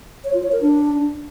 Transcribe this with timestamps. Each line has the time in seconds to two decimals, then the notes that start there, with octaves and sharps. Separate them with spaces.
0.24 C#5
0.34 F4
0.43 C#5
0.52 A#4
0.61 D4